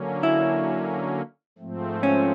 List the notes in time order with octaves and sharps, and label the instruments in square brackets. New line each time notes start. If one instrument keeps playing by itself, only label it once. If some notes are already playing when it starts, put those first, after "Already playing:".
Already playing: [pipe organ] D3 F#3 A#3 C#4
[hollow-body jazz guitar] E4
[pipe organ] G#2 F3 A3 C4
[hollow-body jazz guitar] C#4